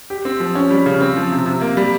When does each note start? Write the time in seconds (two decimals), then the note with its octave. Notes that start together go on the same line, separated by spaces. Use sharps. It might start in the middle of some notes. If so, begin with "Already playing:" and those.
0.10 G4
0.25 C4
0.40 F3
0.55 C#4
0.71 G3
0.86 C#3
1.01 C4
1.16 F3
1.31 C3
1.46 C3
1.61 A#3
1.77 G3